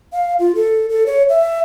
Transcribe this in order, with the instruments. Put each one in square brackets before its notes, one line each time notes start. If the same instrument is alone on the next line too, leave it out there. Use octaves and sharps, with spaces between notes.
[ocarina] F5
F4
A4
A4
C#5
E5